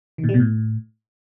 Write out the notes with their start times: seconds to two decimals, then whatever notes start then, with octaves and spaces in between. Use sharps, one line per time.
0.18 D#3
0.24 A#2
0.29 G3
0.34 B2
0.39 A2